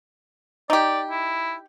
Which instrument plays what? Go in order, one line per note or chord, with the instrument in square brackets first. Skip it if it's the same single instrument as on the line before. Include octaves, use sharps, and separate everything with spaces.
[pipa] D#4 G4 [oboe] D5
[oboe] E4